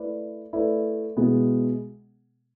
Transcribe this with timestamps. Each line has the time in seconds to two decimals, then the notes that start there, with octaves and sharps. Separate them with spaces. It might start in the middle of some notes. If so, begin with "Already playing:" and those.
Already playing: A3 E4 B4 D5
0.53 A3 E4 B4 D5
1.17 B2 G#3 B3 E4 G#4